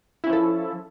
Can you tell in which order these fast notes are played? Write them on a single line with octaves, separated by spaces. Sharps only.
E4 C#4 F3 A4